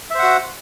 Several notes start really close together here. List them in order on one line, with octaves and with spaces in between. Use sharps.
E5 C5 F#5 F#4